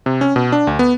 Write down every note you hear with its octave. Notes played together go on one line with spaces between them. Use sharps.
C3
C#4
B2
D4
D2
B3